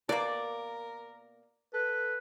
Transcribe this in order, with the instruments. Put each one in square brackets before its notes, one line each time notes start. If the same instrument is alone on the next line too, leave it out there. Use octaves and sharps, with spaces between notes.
[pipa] B2 A#3 [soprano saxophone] A#4 [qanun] D5
[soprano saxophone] A4 [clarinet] B4